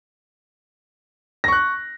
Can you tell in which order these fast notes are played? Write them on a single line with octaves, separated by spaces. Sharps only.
A#6 C#6 F#6